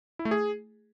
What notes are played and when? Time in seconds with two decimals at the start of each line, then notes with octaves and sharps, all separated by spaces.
0.19 E4
0.25 A3
0.31 G#4